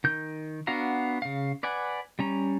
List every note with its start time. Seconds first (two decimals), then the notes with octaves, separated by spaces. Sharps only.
0.04 D#3 G6
0.67 B3 D4 F#4 F5 A#5
1.22 C#3 F5
1.63 B4 D5 F#5 G#5
2.19 G3 C#4 A#5